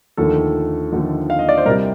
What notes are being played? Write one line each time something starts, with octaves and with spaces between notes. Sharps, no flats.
D#2 D3 F3 A3 A4
D#2 D3 F3 A3
F5
D#5
D5
C5
C2 C3 G3 A#4